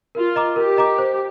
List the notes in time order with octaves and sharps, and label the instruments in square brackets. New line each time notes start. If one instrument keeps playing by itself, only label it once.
[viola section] F4 [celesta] A#4
[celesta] D#5 A#5 D6
[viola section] G4 [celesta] A#4
[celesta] D#5 A#5 D6
C5